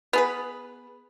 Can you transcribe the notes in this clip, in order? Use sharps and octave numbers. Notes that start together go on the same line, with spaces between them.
B3 G#4 B4